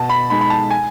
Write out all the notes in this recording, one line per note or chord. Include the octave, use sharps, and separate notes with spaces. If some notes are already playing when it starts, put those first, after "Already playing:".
Already playing: B2 A5
B5
G#3 D#4 B5
B5
A5
G#5